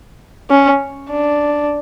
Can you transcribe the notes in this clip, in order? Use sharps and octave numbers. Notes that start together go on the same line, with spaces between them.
C#4
D4